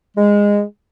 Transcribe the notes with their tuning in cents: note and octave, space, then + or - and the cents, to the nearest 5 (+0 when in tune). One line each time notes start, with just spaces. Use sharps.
G#3 -15